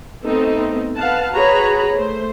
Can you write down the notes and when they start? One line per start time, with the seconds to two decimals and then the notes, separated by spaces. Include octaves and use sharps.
0.25 A3 B3 C4 D#4 A4
0.97 B4 F5 F#5 A5
1.34 F#4 G#4 B4 C#5 A#5 B5
1.95 A3 C5